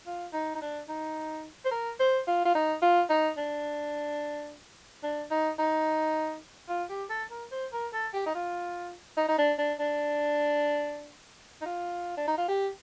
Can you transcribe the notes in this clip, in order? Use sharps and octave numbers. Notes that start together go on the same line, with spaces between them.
F4
D#4
D#4
D4
D#4
C5
A#4
C5
F4
F4
D#4
F4
D#4
D4
D4
D#4
D#4
F4
G4
A4
A#4
C5
A#4
A4
G4
D#4
F4
D#4
D#4
D4
D4
D4
D#4
F4
D4
D#4
F4
G4